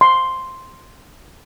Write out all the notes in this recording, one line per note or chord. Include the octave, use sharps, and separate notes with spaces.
C6